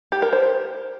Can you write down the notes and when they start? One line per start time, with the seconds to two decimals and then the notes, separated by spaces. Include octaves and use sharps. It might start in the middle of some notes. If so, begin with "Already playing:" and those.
0.12 G4
0.22 A#4
0.33 C5